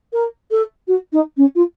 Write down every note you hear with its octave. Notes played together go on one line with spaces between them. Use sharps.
A#4
A4
F#4
D#4
C#4
F4